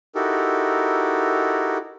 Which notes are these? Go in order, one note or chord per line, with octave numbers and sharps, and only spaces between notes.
D#4 E4 F#4 G4 A4 A#4